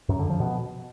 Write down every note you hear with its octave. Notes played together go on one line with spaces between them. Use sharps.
F#2
D3
F3
B2